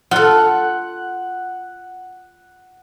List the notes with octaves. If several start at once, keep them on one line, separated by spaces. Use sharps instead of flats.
F4 A4 F#5